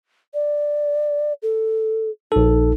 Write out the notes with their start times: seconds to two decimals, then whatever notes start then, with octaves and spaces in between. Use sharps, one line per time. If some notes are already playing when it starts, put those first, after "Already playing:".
0.34 D5
1.42 A4
2.32 A#1 D#4 A4